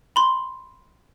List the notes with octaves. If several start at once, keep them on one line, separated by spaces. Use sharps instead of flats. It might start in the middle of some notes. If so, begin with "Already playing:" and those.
B5 C6